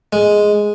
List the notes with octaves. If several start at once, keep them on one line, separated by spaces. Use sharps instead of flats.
G#3